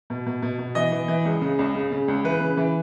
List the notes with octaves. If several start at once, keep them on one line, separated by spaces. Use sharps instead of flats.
B2
B2
B2
B2
E3 D#5
E3
E3
C#2
C#3
C#2
C#3
C#3
C#2
E3 B4
C#3
E3